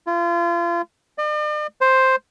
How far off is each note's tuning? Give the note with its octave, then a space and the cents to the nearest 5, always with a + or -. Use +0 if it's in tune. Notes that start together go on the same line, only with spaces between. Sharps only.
F4 -35
D5 +45
C5 +5